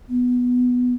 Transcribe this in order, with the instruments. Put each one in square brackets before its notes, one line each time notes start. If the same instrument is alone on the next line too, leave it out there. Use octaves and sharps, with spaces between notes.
[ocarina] B3